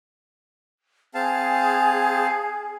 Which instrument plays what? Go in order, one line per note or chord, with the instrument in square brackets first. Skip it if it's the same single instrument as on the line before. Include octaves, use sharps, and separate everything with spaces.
[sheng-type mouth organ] C4 F5 A5 [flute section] G#4